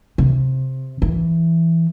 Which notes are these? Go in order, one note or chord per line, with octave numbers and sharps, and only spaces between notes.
C3
E3